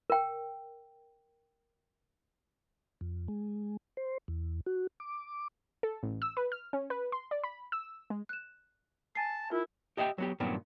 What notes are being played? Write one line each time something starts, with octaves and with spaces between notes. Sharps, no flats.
A#4 G5
F2
G#3
C5
E2
F#4
D6
A4
A1
E6
B4
F6
C#4
B4
C6
D5
B5
E6
G#3
F#6 E7
G#5 A5 C7
E4 F4 A#4
G4 D#5 E5 F#5 G5
F#3 B3 G4
G2 A#2 D#3 F#3 B3 C4